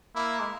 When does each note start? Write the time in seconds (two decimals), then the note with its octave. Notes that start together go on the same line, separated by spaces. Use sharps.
0.16 A#3 E4
0.39 G#3